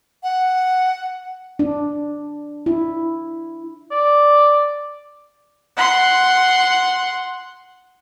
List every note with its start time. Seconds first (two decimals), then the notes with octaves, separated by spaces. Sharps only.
0.23 F#5
1.59 D4
2.66 E4
3.91 D5
5.77 F#5 C6